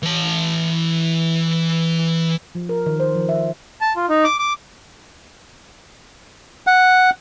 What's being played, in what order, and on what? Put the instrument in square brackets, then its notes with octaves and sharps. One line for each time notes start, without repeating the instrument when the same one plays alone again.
[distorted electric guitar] E3 A5
[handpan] F3
A#4
D#3
C5
F3
E5
[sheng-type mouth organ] A5
F4
D#4
D6
D6
[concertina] F#5